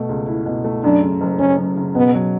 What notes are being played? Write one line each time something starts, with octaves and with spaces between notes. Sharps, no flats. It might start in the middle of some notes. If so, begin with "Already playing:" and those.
Already playing: B2 A3
C#2
E4
B2
A3
F#2 D4
C#3
F#1
F#1 C#4
F#2
C#3
B2 B3
F#3